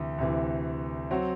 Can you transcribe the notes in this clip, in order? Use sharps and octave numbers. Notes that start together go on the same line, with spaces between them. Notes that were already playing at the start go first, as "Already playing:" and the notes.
Already playing: D2 C3 E3
D2 C3 E3
F#3 C4 F#4